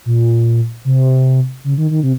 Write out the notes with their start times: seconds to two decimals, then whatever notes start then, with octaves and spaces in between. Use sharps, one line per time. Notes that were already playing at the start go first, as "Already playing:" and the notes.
0.05 A#2
0.85 C3
1.64 C#3
1.78 D#3
1.91 D#3
2.03 C3